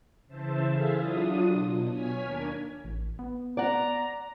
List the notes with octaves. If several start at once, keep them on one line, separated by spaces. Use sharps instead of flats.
C#3 E3 C5 E5 A5
E4 G#4 A4 E5 F5
F#3 D4 F4 D#6
B2
C#5 G#5 F6 G#6 B6
D#2 A#3 D4 A#4 A#5 G#6
A1
B3
D5 F#5 A#5